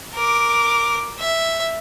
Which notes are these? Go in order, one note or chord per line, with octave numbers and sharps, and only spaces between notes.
A#4 D6
E5